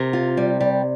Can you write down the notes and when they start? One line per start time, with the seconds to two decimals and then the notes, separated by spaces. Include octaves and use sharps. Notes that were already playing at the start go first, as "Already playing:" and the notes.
Already playing: C3 A#4
0.13 F4
0.37 G3
0.61 G3